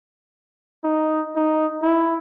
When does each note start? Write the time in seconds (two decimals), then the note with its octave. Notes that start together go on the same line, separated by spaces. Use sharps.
0.84 D#4
1.36 D#4
1.82 E4